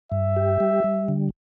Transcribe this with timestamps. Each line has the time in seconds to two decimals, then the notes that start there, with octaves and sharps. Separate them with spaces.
0.12 G2 E5
0.36 G4
0.60 G3
0.84 G3
1.08 D3